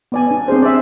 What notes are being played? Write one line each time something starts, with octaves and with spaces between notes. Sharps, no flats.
B3 D5 G#5
D4
C4 D4 G#4 C5
D5 E5